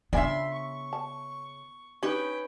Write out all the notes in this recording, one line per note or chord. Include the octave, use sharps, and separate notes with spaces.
C#3 B3 D4 E4 F4 E5 G#5 C6
C#6
A5
C#4 D#4 G4 B4 G5